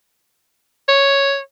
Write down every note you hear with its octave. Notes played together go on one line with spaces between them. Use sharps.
C#5